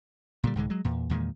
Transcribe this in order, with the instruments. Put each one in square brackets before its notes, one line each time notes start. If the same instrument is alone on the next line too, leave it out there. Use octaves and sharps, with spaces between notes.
[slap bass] A#2 D3 G3
C2 G#2 D3 G#3
F#3 G#3
E2 A#2
E2 A#2 D#3 G#3